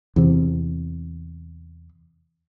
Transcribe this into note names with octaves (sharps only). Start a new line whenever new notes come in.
E2 C3